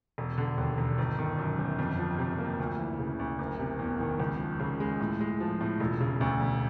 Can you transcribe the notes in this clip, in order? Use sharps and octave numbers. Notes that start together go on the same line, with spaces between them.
E1
D3
D#2
E1
G1
D#3
F#2
G1
F2
F3
C3
A#3
D2
E3
C#3
D2
F#1
C3
E2
D#3
C#2
F3
C#3
G#3
A2
G#3
F3
A2
E1
C#3
D2
E1